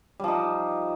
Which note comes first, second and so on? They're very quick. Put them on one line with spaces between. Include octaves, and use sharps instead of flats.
G3 F3 D#4